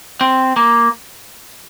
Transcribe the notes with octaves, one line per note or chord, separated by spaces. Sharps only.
C4
A#3